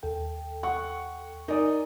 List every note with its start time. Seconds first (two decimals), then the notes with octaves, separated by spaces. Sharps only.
0.03 D#2 A4 G5
0.63 F#5 C#6
1.48 D#4 A#4 D5 G#5 D#6